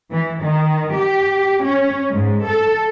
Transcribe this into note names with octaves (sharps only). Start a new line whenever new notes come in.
E3
D#3
G4
C#4
G#2
A4